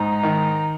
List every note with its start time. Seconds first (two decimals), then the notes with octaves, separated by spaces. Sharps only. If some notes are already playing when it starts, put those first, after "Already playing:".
Already playing: G#2 D#4
0.23 D#3